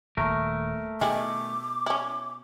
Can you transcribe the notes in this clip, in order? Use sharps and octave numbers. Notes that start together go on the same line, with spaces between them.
D#1 D#2 A3 A#4
B2 D#3 E4 G#4 D6
C#4 E4